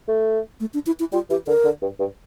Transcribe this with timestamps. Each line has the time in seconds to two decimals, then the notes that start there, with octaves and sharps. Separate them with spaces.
0.08 A3
0.60 A3
0.74 D4
0.86 E4
1.00 E4
1.13 G3 F4
1.30 E3 G4
1.47 D3 A#4
1.65 D3
1.82 G2
1.99 G2